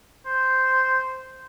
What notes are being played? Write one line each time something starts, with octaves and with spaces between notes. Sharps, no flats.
C5